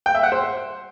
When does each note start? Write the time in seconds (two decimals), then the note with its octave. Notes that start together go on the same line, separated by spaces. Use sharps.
0.06 G5
0.15 E5
0.23 F#5
0.32 C5